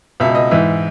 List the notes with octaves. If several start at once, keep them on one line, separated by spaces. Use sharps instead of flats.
C#2 B2 E5
D#5
G#2 E3 E5